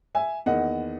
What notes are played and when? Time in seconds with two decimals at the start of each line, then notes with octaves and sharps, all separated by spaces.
0.15 E5 G#5
0.46 E2 D#3 A#3 D#5 F#5